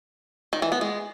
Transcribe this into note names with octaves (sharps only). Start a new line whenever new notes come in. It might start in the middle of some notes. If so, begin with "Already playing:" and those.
D#3
E3
B3
G#3